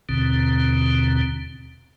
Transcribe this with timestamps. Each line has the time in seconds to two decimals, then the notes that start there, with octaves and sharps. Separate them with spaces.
0.09 D#2 B2 D3 C4